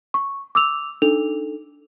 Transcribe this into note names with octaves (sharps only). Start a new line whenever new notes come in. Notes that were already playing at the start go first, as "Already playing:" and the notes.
C#6
D6 E6 F7
D4 D#4 A4 F7